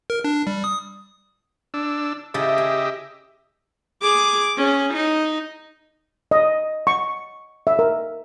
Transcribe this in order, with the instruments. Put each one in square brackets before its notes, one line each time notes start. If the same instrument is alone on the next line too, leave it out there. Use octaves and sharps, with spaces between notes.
[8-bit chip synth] A#4
D4
G3
D#6
[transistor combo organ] D4 E6
[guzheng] C#3 E4 A4 [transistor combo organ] G4 D#5 E5
[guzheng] G#4
[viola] G#4 D6
C#4 G#4
D#4
[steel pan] D#5
C#6
E5
A#4